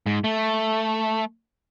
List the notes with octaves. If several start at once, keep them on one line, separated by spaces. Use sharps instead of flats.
G#2
A3